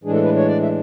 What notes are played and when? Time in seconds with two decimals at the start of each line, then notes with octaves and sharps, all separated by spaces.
0.04 A2 E3 G#3 D4 G#4
0.13 A4
0.24 B4
0.36 C#5
0.47 D5
0.62 E5